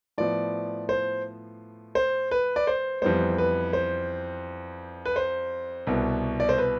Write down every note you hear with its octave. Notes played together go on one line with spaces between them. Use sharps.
A2 F3 B3 D5
C5
C5
B4
D5
C5
F2 E3 G3 B3 C5
B4
C5
B4
C5
C2 B2 B3
D5
C5
B4